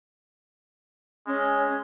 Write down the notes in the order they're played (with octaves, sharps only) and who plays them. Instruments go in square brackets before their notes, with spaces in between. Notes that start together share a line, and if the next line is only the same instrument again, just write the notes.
[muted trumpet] G#3 [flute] C#4